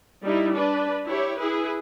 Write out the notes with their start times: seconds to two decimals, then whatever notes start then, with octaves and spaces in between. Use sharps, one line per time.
0.23 G3 D#4 E4
0.53 D4 B4
1.06 E4 G4 C#5
1.38 E4 G#4 B4